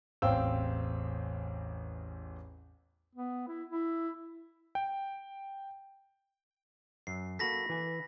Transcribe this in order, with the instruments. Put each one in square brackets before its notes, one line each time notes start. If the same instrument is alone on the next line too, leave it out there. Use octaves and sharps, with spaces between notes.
[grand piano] A1 E2 C4 F5 G5 E6
[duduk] B3
E4
E4
[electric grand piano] G5
[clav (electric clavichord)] F#2 [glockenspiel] C7
[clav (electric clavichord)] A#3 F#4 A4 [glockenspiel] B5 A#6 B6
[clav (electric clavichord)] E3 G#5